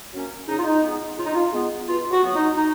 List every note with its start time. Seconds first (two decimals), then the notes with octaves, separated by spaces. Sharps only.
0.13 F#3 A#3 C#4
0.48 C#3 D#4
0.57 F4
0.64 D#4
0.83 G#3 B3
1.17 C#3 F4
1.26 D#4
1.34 F4
1.52 G#3 B3
1.88 B2 F4
2.11 F#4
2.23 F#3 B3
2.34 D#4
2.57 D#4